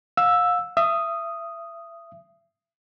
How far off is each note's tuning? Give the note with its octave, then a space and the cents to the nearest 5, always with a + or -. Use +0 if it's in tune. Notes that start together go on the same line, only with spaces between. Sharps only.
F5 +30 E6 +0
E5 +30 D#6 +0